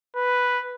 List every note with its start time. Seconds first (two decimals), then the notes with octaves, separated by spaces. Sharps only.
0.16 B4